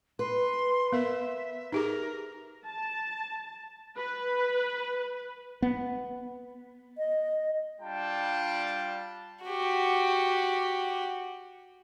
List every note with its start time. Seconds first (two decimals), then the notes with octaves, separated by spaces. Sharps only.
0.19 B4 C6
0.92 B3 A#4 E5
1.72 D#4 G4 G#4 A#4
2.66 A5
3.97 B4
5.62 B3
6.98 D#5
7.81 G3 D4 F4 G5 A5
9.44 F#4 G4